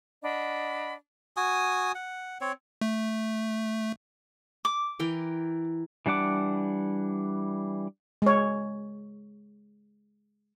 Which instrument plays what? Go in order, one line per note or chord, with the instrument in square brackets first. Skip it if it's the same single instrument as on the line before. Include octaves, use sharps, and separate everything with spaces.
[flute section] D4 D#5 F#5 B5
[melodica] F#4 G#5 D#6
F#5
C4 C#5
[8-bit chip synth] A3
[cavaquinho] D6
[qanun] E3 A#4 G5
[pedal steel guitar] E3 G3 D4 F#5 D6
[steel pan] G#3 C#5